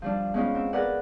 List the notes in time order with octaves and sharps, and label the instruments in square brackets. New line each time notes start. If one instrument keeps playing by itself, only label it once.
[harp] F3 G3 D4
G#3 B3 C#4 D#4 F4
C4
G#4 A#4 B4 D5 F#5